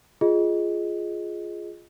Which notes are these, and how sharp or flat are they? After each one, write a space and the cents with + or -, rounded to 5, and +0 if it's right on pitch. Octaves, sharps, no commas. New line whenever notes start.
F4 +0 G#4 +0 D#5 +0